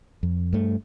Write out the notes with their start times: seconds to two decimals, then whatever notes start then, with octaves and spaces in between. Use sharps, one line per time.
0.23 F2
0.53 G2 A3